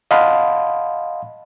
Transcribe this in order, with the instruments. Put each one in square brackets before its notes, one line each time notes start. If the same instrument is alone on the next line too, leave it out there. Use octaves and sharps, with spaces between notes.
[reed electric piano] D#5 F5 F#5 A5 B5 C6